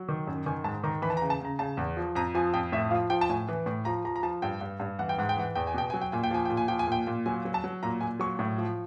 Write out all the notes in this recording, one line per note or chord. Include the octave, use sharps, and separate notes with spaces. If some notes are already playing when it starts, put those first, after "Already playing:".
Already playing: F#3
D#3
F#2
D#3 G#5
G#2 A5
D#3 A#5
E3 B5
A5
A#5
C#3
A5
C#3 A#5
C#3 A5
E2
F3
F2 A#5
F3 G#5
F2 G5
A2 E5
F3 F5
F3 G5
A5
A2 G#5
E3
A2
F3 A#5
F3 A#5
A#5
F3 A5
G2 G5
G2
G2
E3 F#5
G5
G#2 F#5
G5
E3 F#5
E2 G5
G#5
B2 G5
F#3 G#5
G5
A#2 G#5
G5
F3 G#5
A#2 G5
G#5
F3 G5
G#5
A#2 G5
A#2
F#3 G#5
F#3
A5
F#3
A#2 A#5
A#2 G#5
F#3 C#6
A2
F3